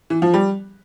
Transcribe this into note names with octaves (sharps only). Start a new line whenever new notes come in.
E3
F3
G3